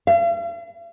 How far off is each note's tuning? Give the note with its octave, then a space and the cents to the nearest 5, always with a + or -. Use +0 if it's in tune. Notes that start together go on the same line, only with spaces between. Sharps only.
F5 -45